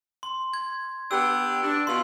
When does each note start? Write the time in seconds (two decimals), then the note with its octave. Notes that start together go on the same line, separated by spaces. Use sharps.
0.23 C6
0.54 G#6
1.11 B3 D4 G4 E6
1.62 D4
1.87 B2 F4 C6